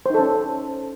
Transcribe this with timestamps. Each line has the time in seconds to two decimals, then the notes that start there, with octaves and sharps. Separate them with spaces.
0.06 C5
0.10 D#4
0.14 A4
0.19 C#4